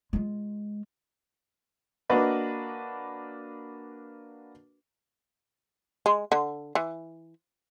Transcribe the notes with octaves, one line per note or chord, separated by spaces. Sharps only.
G#3 F4
A#3 D4 F#4 A#4 B4 D#5
G#3
D3
E3